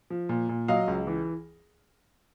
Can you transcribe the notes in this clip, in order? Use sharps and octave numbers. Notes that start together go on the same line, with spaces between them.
F3
A#2
A#2
F#3 D#5 F5
C#2
E3